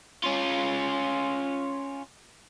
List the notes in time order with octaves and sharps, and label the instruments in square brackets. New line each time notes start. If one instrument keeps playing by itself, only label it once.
[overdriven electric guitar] C#4 F4